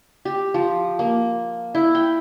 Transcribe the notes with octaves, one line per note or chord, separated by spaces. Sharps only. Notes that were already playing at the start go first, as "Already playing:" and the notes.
G4
F3
A#3
E4
G5